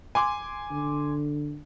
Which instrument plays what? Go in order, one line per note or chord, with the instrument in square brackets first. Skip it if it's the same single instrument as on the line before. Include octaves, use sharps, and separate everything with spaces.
[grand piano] G#5 C6 D6
[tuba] D3